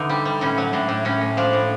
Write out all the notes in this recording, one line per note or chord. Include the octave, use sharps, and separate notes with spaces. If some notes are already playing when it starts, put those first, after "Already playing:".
Already playing: D3 E3 D#4
G3
G3
A2 C#4
F#3
A2 D4
A2
A2 C#4
A2
F3 D4
A2